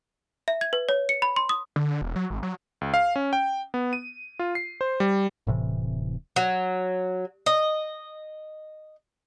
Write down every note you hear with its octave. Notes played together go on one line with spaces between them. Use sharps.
E5
G#6
B4
C#5
C#7
B5
C6
D#6
D3
E1
F#3
G#1
F#3
C#2
F5
C#4
G5
B3
D#7
F4
C7
C5
G3
D1 A2 C3 E3
F#3
D#5